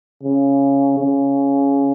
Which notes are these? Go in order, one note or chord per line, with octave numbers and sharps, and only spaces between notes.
C#3
C#3